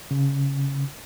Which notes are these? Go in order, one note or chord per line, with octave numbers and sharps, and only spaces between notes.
C#3